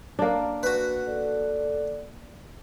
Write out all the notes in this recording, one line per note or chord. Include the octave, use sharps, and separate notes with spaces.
A#3 D4
F#4 B4
A4 D5